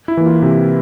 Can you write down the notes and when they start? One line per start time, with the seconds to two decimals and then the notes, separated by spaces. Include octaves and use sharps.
0.08 E4
0.17 E3 A#3
0.26 F4
0.42 C3